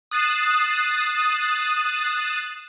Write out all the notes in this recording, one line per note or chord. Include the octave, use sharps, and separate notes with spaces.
D#6 F#6 A6 C7 D#7 E7